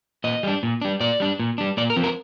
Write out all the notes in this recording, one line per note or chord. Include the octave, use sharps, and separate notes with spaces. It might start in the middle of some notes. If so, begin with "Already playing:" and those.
A#2 D#5
G3 D4
A#2
G3 D4
A#2 D5
G3 D4
A#2
G3 D4
A#2 D5
A#4
F3 C4
A#4